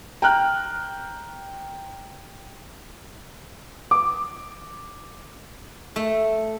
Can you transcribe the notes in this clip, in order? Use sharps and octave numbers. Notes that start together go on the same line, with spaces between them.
G5 A#5 F6 F#6
D6
A3